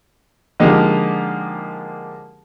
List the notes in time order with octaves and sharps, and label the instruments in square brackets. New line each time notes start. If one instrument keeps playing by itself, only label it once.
[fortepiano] D3 F3 G#3 A#3 D#4 G4